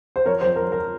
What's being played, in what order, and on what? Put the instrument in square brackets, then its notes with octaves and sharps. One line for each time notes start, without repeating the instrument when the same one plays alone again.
[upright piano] C5
F2 A#4 C#5
C5
F2
A#4
F3 A#4